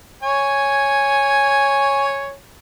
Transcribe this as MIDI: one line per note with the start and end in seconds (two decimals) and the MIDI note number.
0.23 2.35 73
0.23 2.35 80